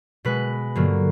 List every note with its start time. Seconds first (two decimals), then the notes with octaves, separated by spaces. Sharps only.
0.25 B2 G#3 B4
0.76 G2 D3 F#3 A#3